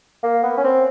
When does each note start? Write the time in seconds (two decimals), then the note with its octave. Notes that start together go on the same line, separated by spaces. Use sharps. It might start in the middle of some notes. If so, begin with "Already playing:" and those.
0.23 A#3
0.43 B3
0.57 C#4
0.64 C4